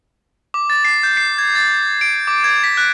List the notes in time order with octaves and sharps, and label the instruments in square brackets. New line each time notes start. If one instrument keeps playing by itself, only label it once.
[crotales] D6
A6
C7
G6
C7
G#6
A6
D7
D6
G#6
B6
F#6